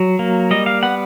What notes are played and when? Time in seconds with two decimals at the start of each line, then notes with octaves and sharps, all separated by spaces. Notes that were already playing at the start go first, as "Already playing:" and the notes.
Already playing: F#3
0.19 A#3
0.51 G3 D#5
0.66 F5
0.83 B3 F#5